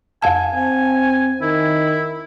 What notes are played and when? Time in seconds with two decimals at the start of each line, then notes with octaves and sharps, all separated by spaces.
0.22 F2 F5 G#5 A5
0.55 C4 G#5
1.42 D#3 E4